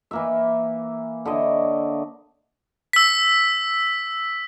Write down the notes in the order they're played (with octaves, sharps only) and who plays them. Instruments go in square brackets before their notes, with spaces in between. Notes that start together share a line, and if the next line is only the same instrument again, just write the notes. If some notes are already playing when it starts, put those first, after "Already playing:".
[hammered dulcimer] E3 A#3 E5
D3 E4 C#5 D#5
[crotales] E6 B6